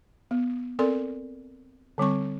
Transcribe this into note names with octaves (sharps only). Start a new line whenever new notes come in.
B3
C4 A4 A#4 D5 C6
D3 G3 C4 C#6